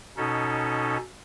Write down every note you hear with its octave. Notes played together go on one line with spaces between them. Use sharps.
B2 C#4 D#4 A4